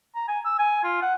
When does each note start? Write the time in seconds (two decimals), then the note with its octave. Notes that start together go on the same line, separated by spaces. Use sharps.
0.15 A#5
0.28 G#5
0.45 E6
0.59 G#5
0.84 F4
1.02 F#5